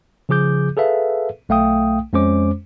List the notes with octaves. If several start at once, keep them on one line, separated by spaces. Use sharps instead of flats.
C#3 F3 G#4 D6 G6
G#4 A4 B4 E5 F5
B1 A3 F5 G5 D#6
F2 G#3 C#4 C5 D6